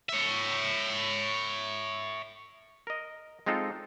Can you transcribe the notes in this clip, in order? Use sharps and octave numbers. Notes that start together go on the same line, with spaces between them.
C#5 E5
A#4 D#5
G#3 C4 D#4 F4 A4